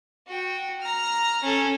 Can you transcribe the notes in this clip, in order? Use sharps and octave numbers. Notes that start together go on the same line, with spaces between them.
F#4 G5
A#5 F6
C#4 A4